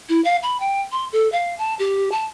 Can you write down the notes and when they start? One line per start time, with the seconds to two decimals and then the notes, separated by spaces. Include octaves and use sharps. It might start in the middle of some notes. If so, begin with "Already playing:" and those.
0.09 E4
0.24 F5
0.43 B5
0.60 G5
0.92 C6
1.13 A4
1.32 F5
1.58 A5
1.79 G4
2.12 A5